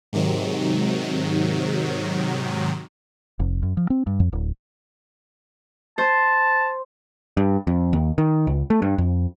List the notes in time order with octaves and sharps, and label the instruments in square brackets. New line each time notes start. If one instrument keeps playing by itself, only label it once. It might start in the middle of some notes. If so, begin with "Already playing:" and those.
[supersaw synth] G#2 C3 D#3 F#3
[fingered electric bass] F1
F#2
F3
C4
G2
F2
D1
[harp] C5 [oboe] A5
[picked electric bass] G2
F2
D#2
D#3
C#2
A3
G2
F2